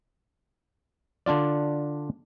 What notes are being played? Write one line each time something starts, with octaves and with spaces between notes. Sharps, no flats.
D3 D4 F4 D5